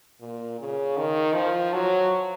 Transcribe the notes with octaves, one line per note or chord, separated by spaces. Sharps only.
A#2
C#3
D#3
F3
F#3